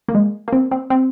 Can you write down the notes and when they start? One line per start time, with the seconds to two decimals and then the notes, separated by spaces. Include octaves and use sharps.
0.08 A#3
0.15 G#3
0.48 A#3
0.53 C4
0.71 C4
0.90 C4